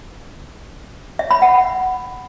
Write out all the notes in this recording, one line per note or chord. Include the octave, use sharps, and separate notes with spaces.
E5
B5
F#5